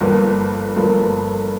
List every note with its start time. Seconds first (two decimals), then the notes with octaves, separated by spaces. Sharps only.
0.01 G1 G2 F3 A#3
0.76 G1 G2 F3 A#3